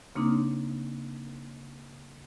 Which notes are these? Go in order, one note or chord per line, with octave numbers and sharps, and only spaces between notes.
C#3 A#3 C4 D4 D#4